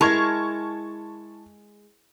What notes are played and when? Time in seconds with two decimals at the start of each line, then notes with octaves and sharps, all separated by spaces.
0.01 G#3 E4 A#4 A5 C#6 G#6